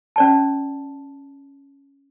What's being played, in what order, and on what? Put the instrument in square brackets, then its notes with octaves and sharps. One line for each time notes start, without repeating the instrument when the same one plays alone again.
[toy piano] C#4 D5 A5